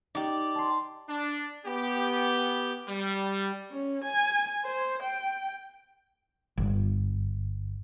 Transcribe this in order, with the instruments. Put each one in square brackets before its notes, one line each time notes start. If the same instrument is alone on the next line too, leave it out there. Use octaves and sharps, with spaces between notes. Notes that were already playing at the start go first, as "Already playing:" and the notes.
[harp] D#4 [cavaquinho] G4 D5
[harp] A5 C6
[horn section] D4
B3 G4
G3
[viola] C#4
G#5
C5
G5
[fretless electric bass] G1